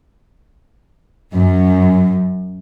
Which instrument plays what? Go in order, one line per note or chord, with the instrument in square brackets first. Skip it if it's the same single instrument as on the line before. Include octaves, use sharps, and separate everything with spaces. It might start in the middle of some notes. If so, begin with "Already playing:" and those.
[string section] F#2